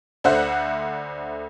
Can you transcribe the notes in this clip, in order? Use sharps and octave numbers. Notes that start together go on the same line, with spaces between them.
D2 D3 C5 E5 F#5 F#6